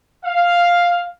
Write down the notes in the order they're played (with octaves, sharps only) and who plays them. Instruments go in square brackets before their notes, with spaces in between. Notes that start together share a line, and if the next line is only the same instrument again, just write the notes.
[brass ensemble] F5